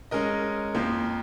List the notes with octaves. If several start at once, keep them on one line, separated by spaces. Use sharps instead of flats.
G#3 C#4 A#4 D#5
F2 F3 A#3